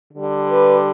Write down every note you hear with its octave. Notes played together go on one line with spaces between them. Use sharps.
D3 G3
B4